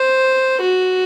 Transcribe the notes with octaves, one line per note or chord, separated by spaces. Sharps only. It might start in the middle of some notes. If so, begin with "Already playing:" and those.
Already playing: C5
F#4